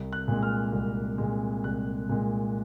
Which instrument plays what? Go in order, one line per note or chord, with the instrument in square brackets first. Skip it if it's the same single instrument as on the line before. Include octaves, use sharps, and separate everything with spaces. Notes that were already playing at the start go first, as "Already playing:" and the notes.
Already playing: [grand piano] C2
F#6
A#2 G#3
F6
C2
A#2 G#3
C2 F#6
A#2 G#3